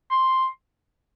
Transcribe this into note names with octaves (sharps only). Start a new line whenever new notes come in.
C6